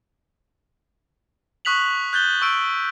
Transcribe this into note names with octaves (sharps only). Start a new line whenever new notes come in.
C#6 D#6 F#6 B6 F7 F#7
F#6 G6 A6 G7
C#6 E6 D7